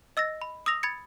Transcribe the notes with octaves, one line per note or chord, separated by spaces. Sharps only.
D#5 E6 A6 A#6
B5
D#6 E6 A#6 F7
B5 G#6 A6 C#7